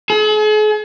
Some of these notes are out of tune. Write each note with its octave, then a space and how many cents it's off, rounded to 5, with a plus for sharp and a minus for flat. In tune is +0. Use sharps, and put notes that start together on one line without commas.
G#4 +45